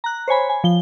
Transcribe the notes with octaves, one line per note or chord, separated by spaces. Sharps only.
A#5 F#6
C5 C#5 G#5 B5
G#5
F3 G7